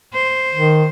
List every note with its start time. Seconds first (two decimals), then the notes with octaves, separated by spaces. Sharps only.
0.14 C5
0.54 D#3